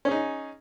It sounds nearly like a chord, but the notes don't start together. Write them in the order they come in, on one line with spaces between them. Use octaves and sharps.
C#4 G#4 D#4